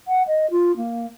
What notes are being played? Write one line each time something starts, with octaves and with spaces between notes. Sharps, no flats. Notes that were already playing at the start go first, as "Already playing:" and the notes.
F#5
D#5
F4
A#3